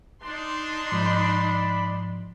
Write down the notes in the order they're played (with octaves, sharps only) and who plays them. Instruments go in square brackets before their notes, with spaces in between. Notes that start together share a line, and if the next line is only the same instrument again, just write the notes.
[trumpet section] D4 [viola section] D#4 C6
[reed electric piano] G#2 F3 [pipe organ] D5 B5